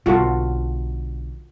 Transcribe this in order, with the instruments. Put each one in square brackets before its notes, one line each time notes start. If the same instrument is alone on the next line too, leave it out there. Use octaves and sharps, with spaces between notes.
[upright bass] B1 D3 [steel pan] F4 F#4 A4